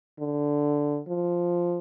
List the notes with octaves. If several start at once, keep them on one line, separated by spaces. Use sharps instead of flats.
D3
F3